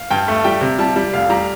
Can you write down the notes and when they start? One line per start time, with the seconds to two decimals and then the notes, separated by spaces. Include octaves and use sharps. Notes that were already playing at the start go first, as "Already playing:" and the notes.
Already playing: F5
0.10 G2 G5
0.28 A3
0.44 G3 G5
0.61 C3
0.79 G3 A5
0.96 G3
1.13 F1 F5
1.30 G3 A#5